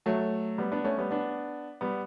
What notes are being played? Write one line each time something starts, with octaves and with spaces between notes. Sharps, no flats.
F#3 A3
G3 B3
B3 D4
A3 C#4
G3 B3
B3 D4
G3 B3